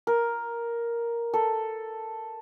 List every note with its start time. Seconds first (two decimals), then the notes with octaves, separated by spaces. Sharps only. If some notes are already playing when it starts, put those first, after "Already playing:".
0.07 A#4
1.34 A4